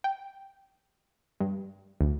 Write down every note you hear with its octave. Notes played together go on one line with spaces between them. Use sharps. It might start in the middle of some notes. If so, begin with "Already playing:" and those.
G5
G2
D2